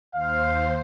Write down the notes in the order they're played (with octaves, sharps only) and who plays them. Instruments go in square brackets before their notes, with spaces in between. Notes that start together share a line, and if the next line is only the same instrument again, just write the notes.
[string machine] D#2 C5 [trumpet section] F5